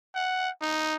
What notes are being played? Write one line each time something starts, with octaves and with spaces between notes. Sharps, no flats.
F#5
D#4